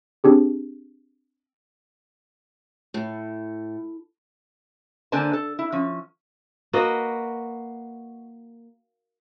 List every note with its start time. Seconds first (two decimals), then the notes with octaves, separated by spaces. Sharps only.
0.24 C4 D4 G4 G#4
2.94 A2
5.12 D3 A#3 D4 C5 G#5 A5
5.33 A4
5.59 E4
5.72 F3 C#4
6.73 A#3 F#4 B4 D#5